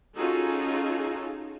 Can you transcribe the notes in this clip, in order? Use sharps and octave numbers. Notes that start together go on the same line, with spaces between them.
C#4 D#4 F4 F#4 G#4 A4